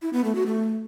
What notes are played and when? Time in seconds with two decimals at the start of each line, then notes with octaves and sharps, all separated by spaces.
0.02 E4
0.13 B3
0.24 A3
0.35 F#4
0.46 A3